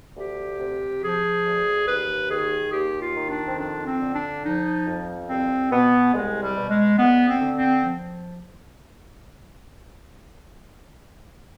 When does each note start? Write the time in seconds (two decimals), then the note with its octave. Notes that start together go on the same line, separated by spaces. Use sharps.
0.16 D2 G4
0.60 C3
1.02 F3 G#4
1.45 D2
1.87 D#2 B4
2.30 D#3 G#4
2.72 D#2 G4
3.01 F4
3.16 D#3
3.29 D4
3.48 C4
3.58 F2 D4
3.87 C4
4.00 D3
4.14 D4
4.43 F3 D#4
4.86 F2
5.28 C2 C4
5.71 B2 B3
6.13 C2 G#3
6.42 G3
6.56 B2
6.70 G#3
6.98 D2 B3
7.27 C4
7.41 D3
7.56 C4
7.84 F3